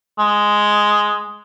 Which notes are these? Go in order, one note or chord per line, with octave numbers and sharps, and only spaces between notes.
G#3